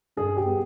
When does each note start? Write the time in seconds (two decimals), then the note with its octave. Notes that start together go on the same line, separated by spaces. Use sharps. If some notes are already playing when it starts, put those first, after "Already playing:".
0.17 G2 G#4
0.37 G4
0.46 G3 B3